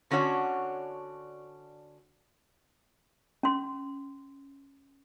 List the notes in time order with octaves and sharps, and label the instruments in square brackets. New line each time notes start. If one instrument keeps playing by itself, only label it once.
[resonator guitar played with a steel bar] D3 C#4 D4 F#4 C#5
[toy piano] C#4 C6